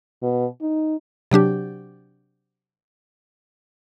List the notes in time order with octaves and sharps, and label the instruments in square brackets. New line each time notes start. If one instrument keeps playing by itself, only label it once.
[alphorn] B2
D#4
[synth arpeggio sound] C3 F#3 D4 G4